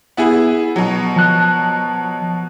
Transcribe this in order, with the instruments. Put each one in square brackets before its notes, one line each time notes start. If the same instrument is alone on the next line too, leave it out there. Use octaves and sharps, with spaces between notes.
[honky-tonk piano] B3 E4 G#4
B2 F#3
[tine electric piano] F3 A5 F#6